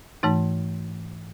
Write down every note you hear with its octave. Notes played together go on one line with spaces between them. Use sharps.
G#2 E3 A3 D#4